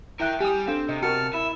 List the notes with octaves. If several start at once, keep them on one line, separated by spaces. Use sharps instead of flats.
E4 A#4 E5 G5 F#6
G3 G4 G#5 D#6
C4 D4 A4 F5
C3 D#5
F#4 A#4 A5 F6 C#7
E4 E5